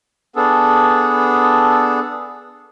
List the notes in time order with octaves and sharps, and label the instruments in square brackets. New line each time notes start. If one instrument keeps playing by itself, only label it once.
[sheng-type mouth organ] B3 D4 G#4 A4